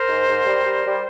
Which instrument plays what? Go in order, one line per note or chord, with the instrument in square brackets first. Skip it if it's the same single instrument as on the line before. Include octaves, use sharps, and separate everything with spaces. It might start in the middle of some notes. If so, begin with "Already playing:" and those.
Already playing: [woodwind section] A#4 C5
G#2
G#2
G3
G3
G3